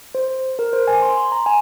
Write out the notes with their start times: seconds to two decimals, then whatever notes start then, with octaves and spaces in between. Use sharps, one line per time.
0.15 C5
0.59 A#4
0.73 C5
0.88 G#5
1.02 C6
1.17 C6
1.32 A#5
1.46 G#5